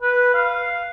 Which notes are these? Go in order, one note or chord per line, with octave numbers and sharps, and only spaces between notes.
B4
F5